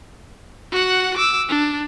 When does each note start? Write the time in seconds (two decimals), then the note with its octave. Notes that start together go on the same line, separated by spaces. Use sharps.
0.72 F#4 F#5
1.17 D6 E6
1.49 D4